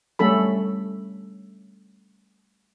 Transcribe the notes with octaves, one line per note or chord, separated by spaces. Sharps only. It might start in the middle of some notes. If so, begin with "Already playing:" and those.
G3 A3 C#4 A4 B5